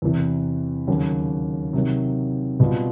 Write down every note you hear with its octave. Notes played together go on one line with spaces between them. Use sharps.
E2 C3 E3
D#2 C#3 F#3
C3 D#3 F#3
B2 G3 C4 F4